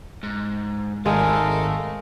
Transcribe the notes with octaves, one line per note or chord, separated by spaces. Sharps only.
G#2
G#1 G#3 A3 A4 A#4 F5